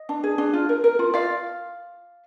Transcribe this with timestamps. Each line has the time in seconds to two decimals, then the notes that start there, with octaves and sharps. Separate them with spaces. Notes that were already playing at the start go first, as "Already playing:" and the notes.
Already playing: D#5
0.09 D4
0.24 G#4
0.38 D4
0.53 F4
0.69 A#4
0.84 A#4
0.99 F4
1.14 F4 D5 F5